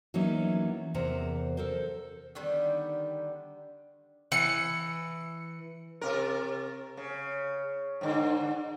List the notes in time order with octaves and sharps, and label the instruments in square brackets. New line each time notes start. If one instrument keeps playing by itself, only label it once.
[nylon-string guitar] E3 F#3 A#3 B3 C#4 D#4
E2 C3 A#4 C5 F#5
A4 A#4 C5
[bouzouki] D3 D#3 G3 B3
[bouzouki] E3 [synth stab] C#7
[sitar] C3 A#4
C#3
G#2 D3